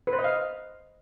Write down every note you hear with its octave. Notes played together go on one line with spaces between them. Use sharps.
B4
C5
D#5
F5